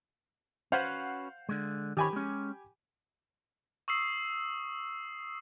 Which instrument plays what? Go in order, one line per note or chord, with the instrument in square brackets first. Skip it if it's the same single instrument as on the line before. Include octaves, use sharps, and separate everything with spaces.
[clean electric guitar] C#4 F#4 B4 [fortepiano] C5 F5 F#5
[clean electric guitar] D3 G#3
[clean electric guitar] D#3 A#4 C#5 [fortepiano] G4 G#5 B5
[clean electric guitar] G#3 C#4
[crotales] C#6 D#6 E6 C7